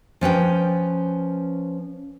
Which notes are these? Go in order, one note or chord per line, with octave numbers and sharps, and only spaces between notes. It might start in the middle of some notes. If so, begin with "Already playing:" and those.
F3 C#4 B4 G5